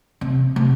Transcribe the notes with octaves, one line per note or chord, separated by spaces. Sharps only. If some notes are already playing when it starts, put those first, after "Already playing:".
C3
C3